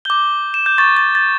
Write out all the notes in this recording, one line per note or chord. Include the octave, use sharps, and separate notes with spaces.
D6 G6 G7
E7
G6
C#6 G6 A6
A6
A6